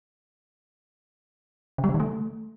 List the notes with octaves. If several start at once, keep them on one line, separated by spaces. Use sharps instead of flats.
C#3
G3
C#3
D#3
A3